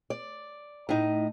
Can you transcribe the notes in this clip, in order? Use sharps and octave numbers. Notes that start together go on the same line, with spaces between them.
D5
A2 D#4